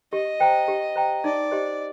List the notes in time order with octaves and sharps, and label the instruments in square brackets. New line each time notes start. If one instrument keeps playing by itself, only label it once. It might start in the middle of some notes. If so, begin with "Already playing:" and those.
[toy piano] G4 [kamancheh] D#5
[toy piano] C5 G5 A#5
G4
C5 G5 A#5
[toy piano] D#4 [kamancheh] D5
[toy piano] G4 C5 D#5